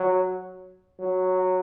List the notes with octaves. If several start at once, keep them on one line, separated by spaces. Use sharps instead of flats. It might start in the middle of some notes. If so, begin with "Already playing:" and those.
Already playing: F#3
F#3